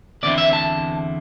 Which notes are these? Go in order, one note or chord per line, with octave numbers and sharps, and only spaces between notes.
E2 D3 C4 E4 D5
E5
A5